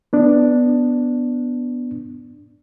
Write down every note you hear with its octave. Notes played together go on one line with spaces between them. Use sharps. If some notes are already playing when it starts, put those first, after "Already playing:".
B3 D4